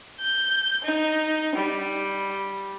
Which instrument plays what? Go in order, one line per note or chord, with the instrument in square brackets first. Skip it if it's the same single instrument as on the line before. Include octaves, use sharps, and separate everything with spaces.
[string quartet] G6
D#4
G3